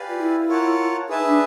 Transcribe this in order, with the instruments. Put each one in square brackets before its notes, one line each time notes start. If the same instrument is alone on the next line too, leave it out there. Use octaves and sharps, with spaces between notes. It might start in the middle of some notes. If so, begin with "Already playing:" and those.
Already playing: [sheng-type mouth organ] G4 B4 D5 F5 G#5
[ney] F4
E4
[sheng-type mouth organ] F4 A#4 C#5 F#5 A5
[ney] D#4 [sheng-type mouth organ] G#4 B4 E5 A5
[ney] D4